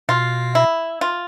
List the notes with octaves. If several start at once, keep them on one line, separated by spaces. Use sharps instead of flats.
B2 F4
E4
F4